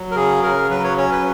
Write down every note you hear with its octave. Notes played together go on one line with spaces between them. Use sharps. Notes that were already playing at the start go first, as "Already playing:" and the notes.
Already playing: F#3
A#4
C#3 G#4
C#3 A#4
F#3 B4
C#5
C#4 C#5
B4